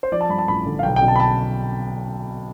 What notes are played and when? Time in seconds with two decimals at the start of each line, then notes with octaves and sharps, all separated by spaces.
0.03 C5
0.12 F3 D5
0.21 A5
0.29 G2 B5
0.38 A5
0.48 A1 B5
0.66 D3
0.79 F5
0.83 B1 G5
0.96 G5
1.02 B2
1.08 A5
1.16 B5
1.20 A5